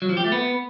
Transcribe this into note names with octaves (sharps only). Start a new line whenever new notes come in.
F#3
F3
G4
A3
B3